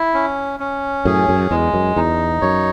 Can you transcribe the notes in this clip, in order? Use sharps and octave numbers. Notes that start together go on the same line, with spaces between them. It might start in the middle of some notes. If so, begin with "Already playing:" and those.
Already playing: E4
C#4
C#4
F#2 A2 G#4
F#2
E2 G#3
F#2
E2 D#4
F#2 C#5